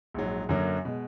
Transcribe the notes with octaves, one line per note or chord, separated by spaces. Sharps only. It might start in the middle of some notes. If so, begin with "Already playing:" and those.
A#1 G#2 F#3
F#2 D3 F#3 A#3
B2 G#3